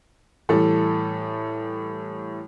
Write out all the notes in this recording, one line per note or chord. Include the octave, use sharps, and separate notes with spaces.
A2 E3 G3 A4